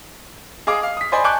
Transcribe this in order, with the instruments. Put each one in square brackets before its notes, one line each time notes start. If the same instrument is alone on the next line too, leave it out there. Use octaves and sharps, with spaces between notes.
[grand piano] G#4 D#5 F5 D6 D#6
F5
D#6 B6
C5 D5 D#5 G#5 B5 C6
G#5 A5 C#6 D6 F#6 G6